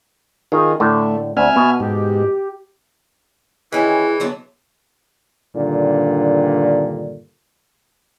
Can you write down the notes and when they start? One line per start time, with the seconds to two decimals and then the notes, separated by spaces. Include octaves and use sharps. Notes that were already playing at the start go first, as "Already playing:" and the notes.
0.52 D#3 D#4 F4 G#4
0.80 A2 D3 A3
1.37 D2 C4 E5 G#5 F6
1.56 B2 B3
1.80 G#2 G4
3.72 D#3 E3 C#4 E4 G#4
4.20 D3 F#3 B3
5.55 G2 A#2 D3 D#3